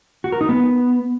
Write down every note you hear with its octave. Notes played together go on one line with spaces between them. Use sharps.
F#4
A#4
D#4
B3